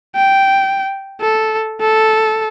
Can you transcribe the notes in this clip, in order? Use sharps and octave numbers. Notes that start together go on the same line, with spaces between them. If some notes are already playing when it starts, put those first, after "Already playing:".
G5
A4
A4